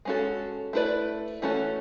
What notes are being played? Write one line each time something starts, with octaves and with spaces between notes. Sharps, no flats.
G#3 C#4 F#4 A4
A3 E4 B4 D5
E3 A3 C#4 F#4 A4